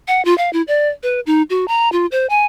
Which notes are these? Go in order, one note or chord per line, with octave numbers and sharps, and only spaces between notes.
F#5
F4
F5
E4
D5
B4
D#4
F#4
A#5
F4
C5
G#5